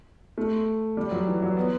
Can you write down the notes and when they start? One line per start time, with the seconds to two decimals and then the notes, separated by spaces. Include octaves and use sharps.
0.38 A3
0.97 G3
1.11 F#3
1.27 E3
1.42 F#3
1.57 B3